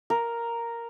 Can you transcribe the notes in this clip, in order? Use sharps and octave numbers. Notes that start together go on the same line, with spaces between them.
A#4